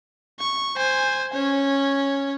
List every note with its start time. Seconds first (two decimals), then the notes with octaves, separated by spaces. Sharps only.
0.39 C#6
0.77 C5 G#5
1.33 C#4 C#5